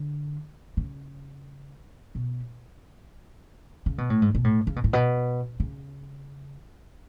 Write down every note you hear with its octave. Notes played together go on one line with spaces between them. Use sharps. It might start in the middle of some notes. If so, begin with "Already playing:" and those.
Already playing: D3
C#3
B2
C#3
B2
A2
G#2
B2
A2
C#3
B2
A2
B2
C#3